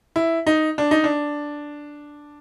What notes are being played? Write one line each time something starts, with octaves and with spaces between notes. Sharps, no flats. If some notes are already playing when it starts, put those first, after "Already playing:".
E4
D#4
D4
D#4
D4